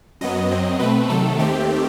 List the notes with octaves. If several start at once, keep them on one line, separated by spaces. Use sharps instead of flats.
F#2 F#3 B3 D#5
F#2 F#3 C4
B2 A3 C4 B4
C3 D#3 F#3 A3 A4
D#2 D#3 A3 C4 G4